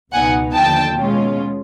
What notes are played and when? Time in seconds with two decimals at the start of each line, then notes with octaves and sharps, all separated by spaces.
0.13 C#2 B2 F#3 B3 D#4 F#5 G#5
0.55 D#2 D3 F3 G5 A5
0.97 B2 G#3 C#4 F4